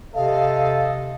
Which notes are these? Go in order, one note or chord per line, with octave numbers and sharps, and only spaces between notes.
C3 A4 D#5 F5